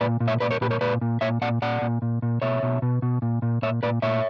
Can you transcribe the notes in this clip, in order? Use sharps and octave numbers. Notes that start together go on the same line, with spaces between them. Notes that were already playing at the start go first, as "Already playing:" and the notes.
A#2 B4 D5
A#2
C#5 E5
A#2 B4 D5
A#4 C#5
A#2 G4 B4
A#4 C#5
A#2 B4 D5
A#2
A#2 C#5 E5
A#2 D5 F#5
A#2 D5 F#5
A#2
A#2
A#2
B2 C#5 E5
B2
B2
B2
A#2
A#2
A#2 C#5 E5
A#2 B4 D5
A#2 C#5 E5